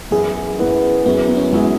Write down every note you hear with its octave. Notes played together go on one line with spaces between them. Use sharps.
F#2 E3 B3 E4 G#4
F#2 E3 B3 E4
F#2 F#3 B3 E4 G#4
B3
C#4
B3
F#2 F#3 G#3 E4 G#4